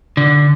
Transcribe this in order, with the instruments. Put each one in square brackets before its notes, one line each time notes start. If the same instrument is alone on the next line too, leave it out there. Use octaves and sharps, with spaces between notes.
[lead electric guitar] D3